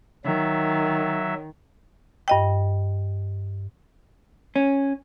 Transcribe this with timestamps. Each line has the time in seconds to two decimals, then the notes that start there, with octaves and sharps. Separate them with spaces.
0.25 D#3 F#3 E5
2.28 G2 D#5 G5
4.56 C#4